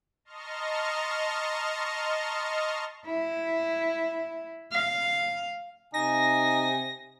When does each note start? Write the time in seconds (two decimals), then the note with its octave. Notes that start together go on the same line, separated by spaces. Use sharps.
0.25 D#5 A5 A#5 C6 C#6 F6
3.06 E4
4.72 F5
5.94 C3 D#4 G#5 A#6